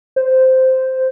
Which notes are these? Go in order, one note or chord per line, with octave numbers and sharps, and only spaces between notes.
C5